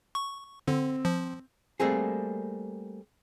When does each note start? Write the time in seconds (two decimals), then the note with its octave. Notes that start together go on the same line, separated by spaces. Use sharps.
0.15 C#6
0.67 D3 C4
1.05 F3
1.80 G3 A3 A#3 C4 G#4